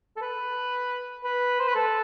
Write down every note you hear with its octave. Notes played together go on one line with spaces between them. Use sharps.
A4
B4
B4
C5
B4
A4